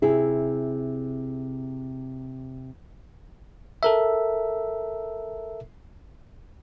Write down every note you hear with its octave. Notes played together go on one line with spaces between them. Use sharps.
C3 E4 G#4
A4 A#4 E5